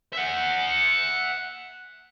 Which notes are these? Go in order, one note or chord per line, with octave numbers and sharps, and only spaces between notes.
E5 F#5